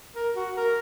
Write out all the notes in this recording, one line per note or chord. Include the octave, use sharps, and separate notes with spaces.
A#4
F#4
A#4